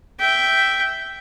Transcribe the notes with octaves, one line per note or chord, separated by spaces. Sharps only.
E5 G5